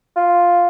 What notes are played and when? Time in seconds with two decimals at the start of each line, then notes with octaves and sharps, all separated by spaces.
0.17 F4